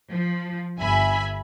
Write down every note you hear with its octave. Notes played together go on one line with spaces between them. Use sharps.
F3
G1 E5 G#5 B5